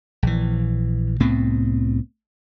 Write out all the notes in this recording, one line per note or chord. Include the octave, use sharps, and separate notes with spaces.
A#1 E3
C2 A2 B3 C4